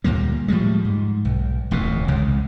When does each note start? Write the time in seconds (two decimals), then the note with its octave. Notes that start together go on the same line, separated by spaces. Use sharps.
0.04 D2 A#2 G3 A#3
0.48 A2 F3 G3 G#3
0.85 G#2
1.25 B1
1.71 D1 A1 F2 B2
2.08 C2 C#3 G#3